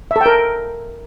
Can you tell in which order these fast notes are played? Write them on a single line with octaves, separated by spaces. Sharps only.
E5 A4 G5 A#4